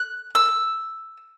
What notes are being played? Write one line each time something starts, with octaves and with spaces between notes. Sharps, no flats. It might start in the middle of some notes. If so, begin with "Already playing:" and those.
Already playing: F#6
E6